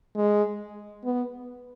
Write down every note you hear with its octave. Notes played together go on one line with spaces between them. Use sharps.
G#3
B3